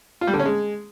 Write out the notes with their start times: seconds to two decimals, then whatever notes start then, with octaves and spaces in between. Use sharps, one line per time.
0.21 F4
0.27 G3
0.33 D3
0.39 C#4
0.46 G#3